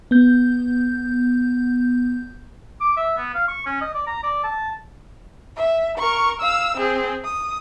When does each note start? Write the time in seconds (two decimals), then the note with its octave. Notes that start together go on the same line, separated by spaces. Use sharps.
0.11 B3 G6
2.80 D6
2.97 E5
3.17 B3
3.34 F5
3.48 C#6
3.66 C#4
3.81 D#5
3.94 D5
4.07 A#5
4.23 D5
4.43 A5
5.56 E5
5.98 A#4 C#6
6.41 F5 E6
6.77 C4 G#4
7.25 D#6